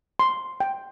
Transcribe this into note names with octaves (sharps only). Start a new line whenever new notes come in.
C6
G5